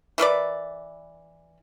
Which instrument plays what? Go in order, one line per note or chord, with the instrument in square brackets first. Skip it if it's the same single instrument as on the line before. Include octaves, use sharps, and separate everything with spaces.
[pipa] E3 A#4 B4 D5